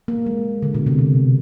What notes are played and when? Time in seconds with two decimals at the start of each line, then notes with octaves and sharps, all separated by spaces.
0.08 A#3
0.26 G#3
0.62 D3
0.75 B2
0.86 C3
0.99 B2